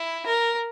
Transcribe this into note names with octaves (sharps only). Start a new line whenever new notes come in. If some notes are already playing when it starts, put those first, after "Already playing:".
Already playing: E4
A#4